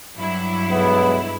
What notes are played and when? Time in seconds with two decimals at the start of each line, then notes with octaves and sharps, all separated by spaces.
0.16 G2 F#3 E4
0.70 B1 G#3 B3